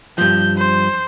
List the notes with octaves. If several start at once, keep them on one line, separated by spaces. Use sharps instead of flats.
G2 F3 G6
C5